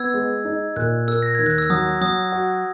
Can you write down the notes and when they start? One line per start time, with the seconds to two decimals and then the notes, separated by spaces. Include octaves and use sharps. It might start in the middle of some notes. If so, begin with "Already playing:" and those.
Already playing: B3 E6 G#6
0.14 G#3
0.45 D#4
0.76 A#2 F#6
1.08 A#3 E6
1.22 A#6
1.35 D#2 G#6
1.46 F#6
1.58 E6
1.70 F#3 D#6
2.01 F#3 D#6
2.32 F#4